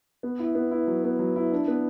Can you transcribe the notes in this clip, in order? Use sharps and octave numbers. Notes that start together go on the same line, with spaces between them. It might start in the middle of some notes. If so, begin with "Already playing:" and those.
B3
E4
B3
E4
F#3
B3
F#3
E4
D4
B3